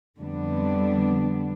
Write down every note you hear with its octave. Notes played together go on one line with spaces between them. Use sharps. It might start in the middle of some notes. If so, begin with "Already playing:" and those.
F2 D3 G3 B3 D4